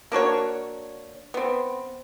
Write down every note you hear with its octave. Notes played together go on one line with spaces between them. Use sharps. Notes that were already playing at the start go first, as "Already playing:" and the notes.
A#3 D4 F#4 C#5
B3 C4